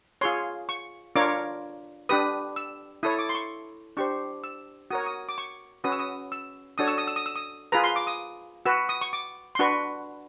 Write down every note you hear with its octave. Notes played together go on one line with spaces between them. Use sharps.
F4 G#4 C#5 C6
C#6
D4 F4 A#4 C#5 D6
D4 G4 B4 D#6
E6
E4 A4 C#5 D#6
D6
C6
C#6
D4 G4 C5 C#6
E6
F#4 A#4 C#5 D#6
D#6
D6
C#6
C#4 F#4 B4 D#6
E6
D#6
E6
D4 F#4 A4 C#5 D#6
E6
D#6
E6
D#6
E6
D#6
F4 G#4 B4 A#5
C6
D6
D#6
F#4 B4 E6
D#6
C#6
D6
C6
D4 F#4 B4 C#6